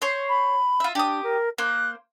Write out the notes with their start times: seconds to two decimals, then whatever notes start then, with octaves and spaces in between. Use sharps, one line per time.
0.02 C5 C#5 C6
0.29 B5
0.80 F4 E5
0.95 D4 G4 D#6
1.23 A#4
1.58 A#3 C5 F#6